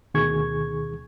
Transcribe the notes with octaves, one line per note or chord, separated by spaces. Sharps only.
D2 B2 D#3 G#4 C#6 G#6